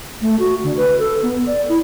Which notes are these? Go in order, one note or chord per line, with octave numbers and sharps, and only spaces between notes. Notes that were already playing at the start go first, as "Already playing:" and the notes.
A3
F#4
D3
B4
A4
B3
D5
E4